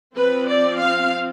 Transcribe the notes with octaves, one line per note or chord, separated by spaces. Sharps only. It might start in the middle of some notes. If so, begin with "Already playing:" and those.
F3 C4 B4
D5
F5